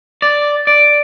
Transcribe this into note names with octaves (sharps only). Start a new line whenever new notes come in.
D5
D5